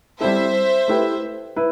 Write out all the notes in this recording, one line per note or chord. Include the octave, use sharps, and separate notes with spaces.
G3 C4 E4 A4 C5 E5
A3 E4 G4 B4
E4 B4